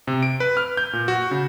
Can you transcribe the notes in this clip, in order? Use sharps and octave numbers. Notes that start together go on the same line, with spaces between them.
C3
D7
B4
F6
G6
A#2
F#4
C#3